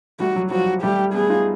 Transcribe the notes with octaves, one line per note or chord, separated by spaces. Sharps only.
G3 A3 F#4
F#3
F3 G3 F#4
G3 A3 G4
A3 B3 G#4
D#4 F4